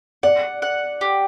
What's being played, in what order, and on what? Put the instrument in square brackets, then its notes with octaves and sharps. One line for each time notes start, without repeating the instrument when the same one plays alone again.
[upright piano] D5 [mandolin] F#5
[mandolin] F#5
G4